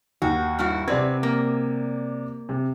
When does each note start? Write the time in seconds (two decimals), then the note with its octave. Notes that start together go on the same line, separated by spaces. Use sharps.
0.22 D#2 F#4
0.59 G2 E4 F#4
0.88 C3 C4 B4 D5 G#6
1.23 A#3
2.49 C3